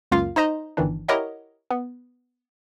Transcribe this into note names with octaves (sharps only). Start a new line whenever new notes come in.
C#2 F#2 A#3 F4 F5
D#4 C5 D#5 A#5
G1 D#3 E3 D4
E4 G4 A#4 C#5 D#5 F#5
B3